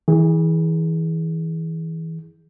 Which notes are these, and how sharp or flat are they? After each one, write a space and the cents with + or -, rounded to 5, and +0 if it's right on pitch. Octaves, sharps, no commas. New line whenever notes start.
E3 -30 G#4 +0